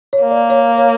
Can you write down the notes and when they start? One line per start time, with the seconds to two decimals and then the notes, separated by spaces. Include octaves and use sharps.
0.13 C#5
0.22 A#3
0.31 D5
0.50 C#5
0.78 C#5